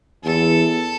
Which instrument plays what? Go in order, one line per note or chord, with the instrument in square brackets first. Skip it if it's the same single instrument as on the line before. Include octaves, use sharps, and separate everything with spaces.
[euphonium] E2 [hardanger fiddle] A4